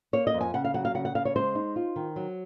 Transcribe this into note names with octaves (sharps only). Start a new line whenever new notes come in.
A#3 C#5
D#5
F2
G#5
C#3 F#5
F5
F#3 F#5
F5
C#3 F#5
F#5
C#3 F5
C#5
G#3 C5
D#4
F4
D#3
F#3